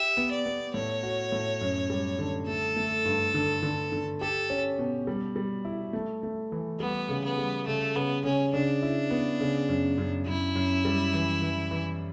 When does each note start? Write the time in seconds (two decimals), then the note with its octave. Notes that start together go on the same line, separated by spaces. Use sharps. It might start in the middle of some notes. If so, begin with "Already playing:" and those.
Already playing: G4 E5
0.17 B3
0.31 D5
0.46 B3
0.74 A2 C#5
1.03 F#4
1.32 A2
1.61 F#2
1.90 G3
2.19 D3
2.47 A3 A4
2.76 A3
3.05 G2
3.34 D3
3.63 D3
3.92 D3
4.21 G4 A4
4.50 C#4
4.79 B2
5.07 G3
5.36 G3
5.65 E4
5.93 A3
6.23 A3
6.52 E3
6.80 G3 B3
7.09 C#3
7.24 B3
7.38 G3
7.67 C#3 A3
7.95 C#3 B3
8.24 C#3 C#4
8.54 C#3 D4
8.83 E4
9.11 B3
9.40 C#3
9.69 F#2
9.98 F#2
10.26 F#2 E4
10.55 F#2
10.85 G3
11.14 E3
11.42 E3
11.71 E3